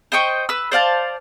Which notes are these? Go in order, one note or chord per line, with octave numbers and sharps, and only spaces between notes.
C5 D#5 G5 C#6
B4 E6
C5 D5 F5 A5